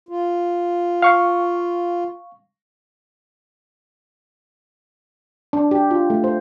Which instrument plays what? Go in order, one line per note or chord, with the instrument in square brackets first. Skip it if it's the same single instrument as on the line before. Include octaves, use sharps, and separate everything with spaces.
[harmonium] F4
[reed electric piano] F5 C#6
[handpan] D4
G4
F4
A3
C5